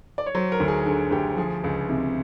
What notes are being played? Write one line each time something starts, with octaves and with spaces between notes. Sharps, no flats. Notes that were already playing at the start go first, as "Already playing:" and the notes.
D5
C#5
F#3 C5
A#4
D2
G#4
D3 G#4
D2 G4
F3 G#4
C#2
C3